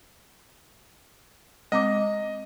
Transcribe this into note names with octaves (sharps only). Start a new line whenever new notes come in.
G#3 C4 D#5 D6